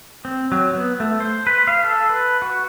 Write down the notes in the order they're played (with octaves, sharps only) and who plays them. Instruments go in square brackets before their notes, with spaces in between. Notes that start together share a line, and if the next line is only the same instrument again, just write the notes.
[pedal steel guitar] C4
F#3
B3
A3
C5
B4
F5
A4
B4
F#4